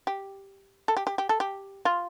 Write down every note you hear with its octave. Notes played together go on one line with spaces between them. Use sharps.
G4
A4
G4
G4
G4
A4
G4
F4